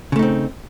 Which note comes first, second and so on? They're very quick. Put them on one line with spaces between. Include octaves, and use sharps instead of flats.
C#3 A3 D#4 C4